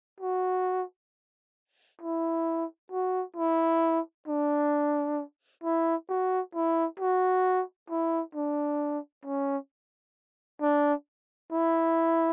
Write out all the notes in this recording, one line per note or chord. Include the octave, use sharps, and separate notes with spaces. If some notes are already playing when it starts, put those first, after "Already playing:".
F#4
E4
F#4
E4
D4
E4
F#4
E4
F#4
E4
D4
C#4
D4
E4